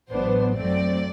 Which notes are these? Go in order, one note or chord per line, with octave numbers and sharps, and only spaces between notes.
A1 A2 F#3 B3 D4 C5
F#2 F#3 A3 C4 D5